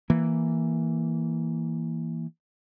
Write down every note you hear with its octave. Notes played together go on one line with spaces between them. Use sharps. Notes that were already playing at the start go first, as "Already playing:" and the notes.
E3 A#3